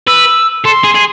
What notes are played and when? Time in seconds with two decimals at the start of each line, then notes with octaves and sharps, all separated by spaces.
0.07 B4 E6
0.64 A4 C6
0.84 G#4
0.94 G#4